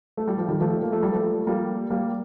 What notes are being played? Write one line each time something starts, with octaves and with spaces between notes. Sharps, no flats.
A3
G3
F3
D#3 G3
F3 A3
A#3
A3
G3
F3 A3
G3 A#3
G3 A#3